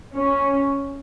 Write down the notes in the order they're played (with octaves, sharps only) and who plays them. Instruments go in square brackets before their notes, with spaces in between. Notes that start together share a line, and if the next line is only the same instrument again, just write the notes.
[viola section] C#4